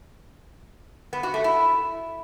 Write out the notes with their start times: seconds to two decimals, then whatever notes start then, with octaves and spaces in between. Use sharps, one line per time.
1.13 B3
1.23 F#4
1.34 A3
1.44 E4